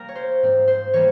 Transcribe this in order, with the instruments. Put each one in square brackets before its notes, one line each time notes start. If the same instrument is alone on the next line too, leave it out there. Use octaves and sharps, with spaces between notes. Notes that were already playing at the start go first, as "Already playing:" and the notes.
Already playing: [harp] G3 A#3 A#4
C#5
C5
G#2 F3 G#3 C4
C5
E3 G3 A#3 C#5